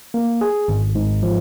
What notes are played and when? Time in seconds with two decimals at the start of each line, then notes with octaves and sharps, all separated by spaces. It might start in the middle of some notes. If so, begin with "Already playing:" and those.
0.14 A#3
0.41 G#4
0.68 G#1
0.95 G#2
1.23 F3